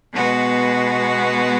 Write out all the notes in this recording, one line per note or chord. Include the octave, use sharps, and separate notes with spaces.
B2 G#3 B3 F#4 B4